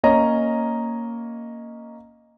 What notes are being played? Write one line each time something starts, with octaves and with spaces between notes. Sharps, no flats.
A#3 C#4 C#5 D#5 A#5